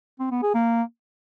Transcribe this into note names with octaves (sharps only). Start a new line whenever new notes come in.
C4
B3
G#4
A#3